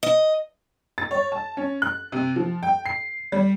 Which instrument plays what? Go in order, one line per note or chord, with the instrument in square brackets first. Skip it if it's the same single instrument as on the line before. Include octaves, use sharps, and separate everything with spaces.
[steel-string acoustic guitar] D#5
[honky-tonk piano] A6
C#5
A5
C#4
F#6
C3
F3
G5
C7
G3